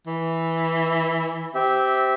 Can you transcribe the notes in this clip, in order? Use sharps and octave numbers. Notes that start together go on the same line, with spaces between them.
E3
C4 G4 E5